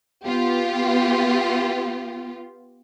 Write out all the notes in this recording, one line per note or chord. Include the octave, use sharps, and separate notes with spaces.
B3 F4 G4